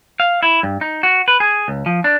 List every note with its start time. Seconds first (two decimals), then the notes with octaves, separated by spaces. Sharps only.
0.20 F5
0.43 E4
0.63 G2
0.81 D#4
1.03 F#4
1.28 B4
1.40 G#4
1.68 C#2
1.86 F3
2.04 D4